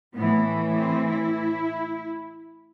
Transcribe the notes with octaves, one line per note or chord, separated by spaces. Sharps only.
A2 E3 B3
A3
C4
E4